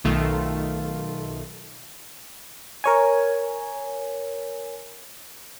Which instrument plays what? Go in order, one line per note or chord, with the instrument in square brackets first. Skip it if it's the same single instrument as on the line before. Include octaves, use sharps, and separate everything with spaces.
[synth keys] B1 D#3 A3 F4
[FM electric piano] A#4 C#5 G#5